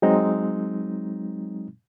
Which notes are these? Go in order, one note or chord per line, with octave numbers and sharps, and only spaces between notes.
F#3 G#3 C4 D#4